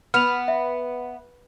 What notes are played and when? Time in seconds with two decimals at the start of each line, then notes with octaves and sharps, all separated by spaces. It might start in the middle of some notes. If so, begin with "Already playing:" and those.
0.14 B3 F6 F7
0.48 E5